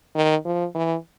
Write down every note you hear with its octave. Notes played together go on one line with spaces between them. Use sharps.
D#3
F3
E3